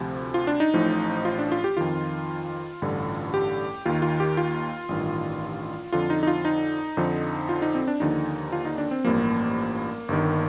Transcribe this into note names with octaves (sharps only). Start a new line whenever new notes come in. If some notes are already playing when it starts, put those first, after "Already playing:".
Already playing: D2 C3 F3
F4
D4
D#4
A1 A2 F3
F4
D4
F4
G4
F2 D#3 F4
A1 G2 D3
G4
D#2 D#3 F4
F4
G4
F4
A1 G2 D#3
F2 D3 F3 F4
D#4
D#4
F4
D#4
F2 D3 F3
F4
D#4
C4
D4
D#2 D3 F3 D#4
F4
D#4
D4
C4
A1 G2 F3 A#3
G1 G2 D#3